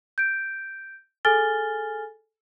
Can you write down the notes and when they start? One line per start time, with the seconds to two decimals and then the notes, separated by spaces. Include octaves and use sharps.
0.18 G6 D7
1.25 G#4 A4 G#5 F6 A6 G7